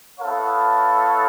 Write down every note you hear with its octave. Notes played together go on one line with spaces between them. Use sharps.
B3 E4 A4 C#5 F5